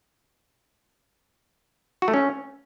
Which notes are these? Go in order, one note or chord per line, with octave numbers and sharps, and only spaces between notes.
F#4
A3
C#4